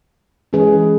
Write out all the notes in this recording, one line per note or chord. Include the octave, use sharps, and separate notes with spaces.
E3 G#3 C#4 G#4 B4